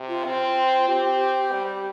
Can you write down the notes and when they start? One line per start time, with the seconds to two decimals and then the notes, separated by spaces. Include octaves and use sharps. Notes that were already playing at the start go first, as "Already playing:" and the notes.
Already playing: C3
0.08 F4
0.24 C4
0.88 C4 G4
1.52 G3